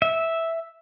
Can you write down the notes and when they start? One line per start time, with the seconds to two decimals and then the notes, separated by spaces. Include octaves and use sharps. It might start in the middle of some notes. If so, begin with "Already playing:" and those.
0.02 E5